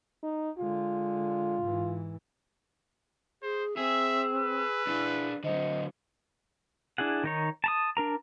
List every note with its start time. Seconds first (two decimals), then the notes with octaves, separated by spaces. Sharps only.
0.23 D#4
0.58 D3 G#3 F4
1.61 G#2 E3
3.43 G#4 C5
3.77 C4 G#4 E5 E6
4.34 B4
4.87 D4 E4 G#4
5.44 D3 F#3 C5 D#5
6.98 D4 E4 G#4 F#5
7.24 D#3 D#4 C#5
7.64 A5 A#5 D#6
7.97 D4 A#4 A#5